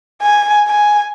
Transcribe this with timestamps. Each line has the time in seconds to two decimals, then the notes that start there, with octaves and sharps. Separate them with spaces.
0.23 G#5
0.68 G#5